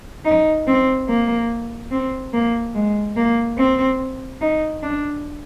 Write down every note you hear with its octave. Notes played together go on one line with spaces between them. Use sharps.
D#4
C4
A#3
C4
A#3
G#3
A#3
C4
D#4
D4